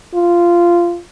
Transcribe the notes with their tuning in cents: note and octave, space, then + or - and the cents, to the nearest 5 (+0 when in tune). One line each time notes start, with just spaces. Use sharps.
F4 -15